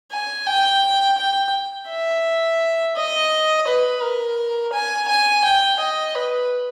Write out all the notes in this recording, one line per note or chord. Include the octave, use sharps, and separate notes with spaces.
G#5
G5
G5
E5
D#5
B4
A#4
G#5
G#5
G5
D#5
B4